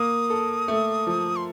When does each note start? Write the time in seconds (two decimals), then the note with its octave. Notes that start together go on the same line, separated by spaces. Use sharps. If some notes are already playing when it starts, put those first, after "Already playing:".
Already playing: A#3 D#6
0.30 A4
0.68 A3
1.07 F3
1.36 C6